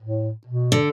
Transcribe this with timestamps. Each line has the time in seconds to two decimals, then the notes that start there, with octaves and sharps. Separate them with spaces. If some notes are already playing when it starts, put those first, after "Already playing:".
0.01 A2
0.47 B2
0.72 D3